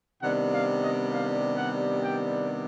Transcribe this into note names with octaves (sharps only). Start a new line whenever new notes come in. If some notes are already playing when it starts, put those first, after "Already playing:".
C3 D#3 G3 B3 D4 F#5
F5
D#5
F5
F#5
G5